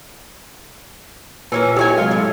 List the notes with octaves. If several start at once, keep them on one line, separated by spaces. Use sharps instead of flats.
A#2 E3 C#4 A#4
F#3 E4 G4 A4 C#5 G#5
C3 F#3 G#3 F4
A2